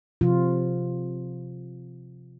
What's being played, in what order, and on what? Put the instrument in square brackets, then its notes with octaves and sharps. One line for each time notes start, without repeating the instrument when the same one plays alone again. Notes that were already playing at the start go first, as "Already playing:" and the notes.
[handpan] C3 F3 F4